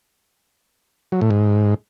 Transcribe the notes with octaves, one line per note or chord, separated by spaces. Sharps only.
F#3
A2
G#2